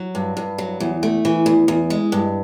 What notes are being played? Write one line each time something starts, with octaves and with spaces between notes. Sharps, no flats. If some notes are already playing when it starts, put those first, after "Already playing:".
Already playing: F#3
G2
G2
F#3
E2
A3
E3
E2
E2
G#3
G2